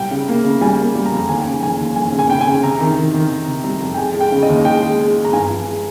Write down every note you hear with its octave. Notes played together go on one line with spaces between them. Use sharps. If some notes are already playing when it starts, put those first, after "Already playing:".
Already playing: C2 G3 G5
C#3
A#3
C#3
G3 G#5
A#3
G3
A#5
F2
D#2 G#5
G5
C#3 G#5
F1 G#5
D#2
F1 G#5
C#3
G#5
C#3 G5
G#5
C#3
C3 A#5
D#3
D#3
D#3
C3 A#5
C3
G3 A#5
F2
G5
G#3 G#5
G#3
G5
C#3
D#5
D#2
G#3 G5
G#3
G#3
G#3
A#5
G2 G#5
F3
G#3